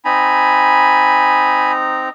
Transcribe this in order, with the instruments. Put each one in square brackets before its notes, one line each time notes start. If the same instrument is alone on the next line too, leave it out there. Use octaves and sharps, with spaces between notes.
[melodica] C4 D#4 A#5 [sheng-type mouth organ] G#5 B5